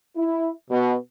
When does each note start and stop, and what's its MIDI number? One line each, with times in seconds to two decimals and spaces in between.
0.17 0.51 64
0.70 0.94 47